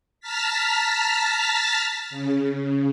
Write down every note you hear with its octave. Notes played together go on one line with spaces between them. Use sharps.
A5 A#5 F6 A6 B6
C#3